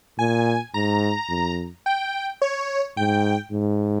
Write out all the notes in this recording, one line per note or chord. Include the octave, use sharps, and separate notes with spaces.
A#2 G#5
G#2 A#5
F2
G5
C#5
G#2 G5
G#2